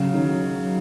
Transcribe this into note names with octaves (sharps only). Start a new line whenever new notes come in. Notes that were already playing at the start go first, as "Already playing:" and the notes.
Already playing: C#3 F#3
D#3